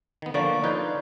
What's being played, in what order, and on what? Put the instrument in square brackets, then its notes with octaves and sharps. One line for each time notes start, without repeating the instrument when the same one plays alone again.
[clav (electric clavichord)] D#3 B3
[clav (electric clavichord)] D3 F3 A#3 [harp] B4 D5 C#6
[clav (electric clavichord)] D#4 B4 C#5 [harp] F4 G6